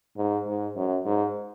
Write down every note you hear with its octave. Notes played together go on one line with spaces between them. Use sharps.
G#2
G#2
F#2
G#2